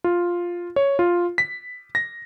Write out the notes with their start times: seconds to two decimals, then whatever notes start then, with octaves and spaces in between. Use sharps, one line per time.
0.04 F4
0.76 C#5
0.99 F4
1.38 B6
1.95 A#6